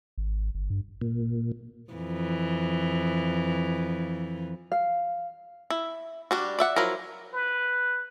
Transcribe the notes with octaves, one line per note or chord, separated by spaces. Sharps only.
G#1
G1
G2
A#2
F2 E3
F5
E4
G3 D4 F#4
D5 E5 F#5
F3 F#3 E4 A#4
B4